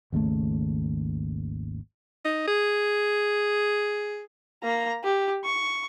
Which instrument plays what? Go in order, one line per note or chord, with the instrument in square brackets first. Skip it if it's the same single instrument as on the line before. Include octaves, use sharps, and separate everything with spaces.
[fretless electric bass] G#1 D#2 C#3 A3
[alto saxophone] D#4
G#4
[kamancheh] A#3 A#5
G4
C#6